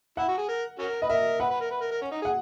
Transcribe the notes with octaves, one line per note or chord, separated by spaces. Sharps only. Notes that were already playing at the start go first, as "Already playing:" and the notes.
E4 F#5
F#4
G#4
A#4
C#4 F#4 A#4
B4 D#5
A#4 E5
B4 F#5
B4
A#4
B4
A#4
A#4
C#4
D#4
G#4 F#5